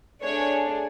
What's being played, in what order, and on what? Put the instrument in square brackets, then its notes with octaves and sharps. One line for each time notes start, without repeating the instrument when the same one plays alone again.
[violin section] A3 D4 G#4 C#5